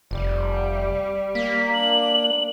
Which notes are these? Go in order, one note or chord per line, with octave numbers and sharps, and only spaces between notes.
F1 G3
A#3 B6
D4 F#7